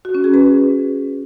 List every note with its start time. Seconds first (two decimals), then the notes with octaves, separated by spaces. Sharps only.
0.05 F#4
0.15 C#4
0.24 G#4
0.34 B4